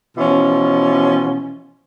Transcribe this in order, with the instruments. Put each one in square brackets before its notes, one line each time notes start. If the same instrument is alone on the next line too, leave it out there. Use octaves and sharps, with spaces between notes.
[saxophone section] B2 E3 F3 C#4